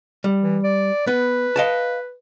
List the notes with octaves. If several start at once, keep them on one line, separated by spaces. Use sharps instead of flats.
G3
E3
D5
B3 B4
D#5 F5 A5